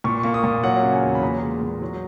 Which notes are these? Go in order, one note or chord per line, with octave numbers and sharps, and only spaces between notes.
A#2 C#6
A#3 C#6
D#6
A#2
F#3 F#5
C#3
G#5
E2
B5
A#2 A#5
G#3
A#2
F#3